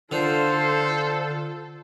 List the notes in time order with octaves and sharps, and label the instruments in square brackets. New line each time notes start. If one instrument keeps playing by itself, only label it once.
[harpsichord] D3 [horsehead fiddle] F4 [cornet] A4 [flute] C5